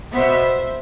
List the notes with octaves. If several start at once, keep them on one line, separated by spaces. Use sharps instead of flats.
B2 B3 C5 E5